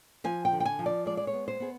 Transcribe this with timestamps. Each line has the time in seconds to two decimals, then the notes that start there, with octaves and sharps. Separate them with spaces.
0.24 F3 G#5
0.45 G5
0.53 D3
0.60 G5
0.65 G#5
0.79 F3
0.86 D5
1.06 G#3 D5
1.17 D5
1.27 C#5
1.33 B3
1.48 C5
1.60 B3 G#4